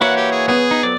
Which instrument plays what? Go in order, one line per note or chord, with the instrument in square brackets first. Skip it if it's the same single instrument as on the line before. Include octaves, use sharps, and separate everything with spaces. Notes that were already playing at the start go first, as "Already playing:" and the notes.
[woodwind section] E3 C#5 [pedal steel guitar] A#3 E4 F#4 [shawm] F#5
[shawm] G4
G#4
[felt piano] B3 [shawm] G#4
[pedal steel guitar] D#4
[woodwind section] F2 F#3 [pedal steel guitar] D5